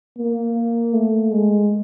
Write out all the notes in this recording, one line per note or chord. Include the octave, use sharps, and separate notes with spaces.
A#3
A3
G#3